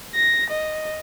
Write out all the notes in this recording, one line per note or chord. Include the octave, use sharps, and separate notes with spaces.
A#6
D#5